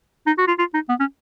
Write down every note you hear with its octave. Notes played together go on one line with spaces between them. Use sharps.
D#4
F#4
F4
F4
D#4
B3
C#4